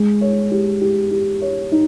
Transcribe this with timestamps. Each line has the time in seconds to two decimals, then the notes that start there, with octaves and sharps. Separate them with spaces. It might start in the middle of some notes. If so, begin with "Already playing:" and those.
Already playing: G#3
0.21 C#5
0.51 G4
0.81 G4
1.11 G4
1.42 C#5
1.72 D#4